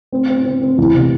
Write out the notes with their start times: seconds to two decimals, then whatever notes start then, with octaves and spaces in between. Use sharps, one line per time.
0.12 C4
0.29 C4
0.44 C4
0.62 C4
0.78 E2
0.94 C3